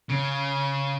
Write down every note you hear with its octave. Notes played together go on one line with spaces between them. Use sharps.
C#3